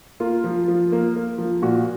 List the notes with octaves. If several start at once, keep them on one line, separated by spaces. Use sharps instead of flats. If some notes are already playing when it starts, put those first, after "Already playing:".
A#3 F4
F3
F3
A#3
A#3
F3
A#2 F#4